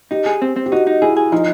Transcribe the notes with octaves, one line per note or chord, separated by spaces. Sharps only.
D#4 G4
G#4
C4
C4
G4
D#4 F#4
D#4
E4 G#4
G#4
F3 D#4